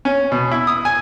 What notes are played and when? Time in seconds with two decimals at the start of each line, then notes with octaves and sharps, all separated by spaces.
0.05 C#4
0.32 B2
0.51 E4
0.67 D#6
0.85 G#5